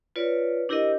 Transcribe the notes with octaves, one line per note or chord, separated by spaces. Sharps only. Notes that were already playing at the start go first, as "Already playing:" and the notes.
F4 B4 C#5 D5
D4 E4 G4 A#4 C5 D#5